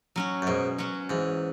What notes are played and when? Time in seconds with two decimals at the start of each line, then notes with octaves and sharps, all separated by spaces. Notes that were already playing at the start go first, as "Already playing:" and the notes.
0.16 F#3 C#4 F#4
0.42 F#2
0.47 G#2 B2
0.78 F#3 C#4 F#4
1.10 G#2 E3